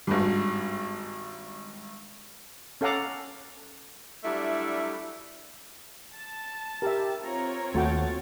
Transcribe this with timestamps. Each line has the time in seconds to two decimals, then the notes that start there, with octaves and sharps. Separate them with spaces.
0.07 G#1 G2
2.81 C#4 A4 F5 F#5 A#5 D6
4.24 F#3 G3 A3 D4 E4
6.14 A5
6.82 G4 A#4 E5
7.23 C4 F4 C#5 A#5
7.74 D#2 A3 F#4 G5 A6